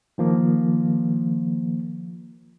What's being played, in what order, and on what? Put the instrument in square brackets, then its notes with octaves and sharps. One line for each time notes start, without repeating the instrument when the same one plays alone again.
[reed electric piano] D#3 F3 A#3